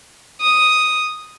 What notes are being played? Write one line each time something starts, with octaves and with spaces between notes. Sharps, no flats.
D#6